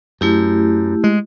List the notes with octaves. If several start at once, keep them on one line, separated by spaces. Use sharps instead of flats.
F#2 A3 E4 G4
G#3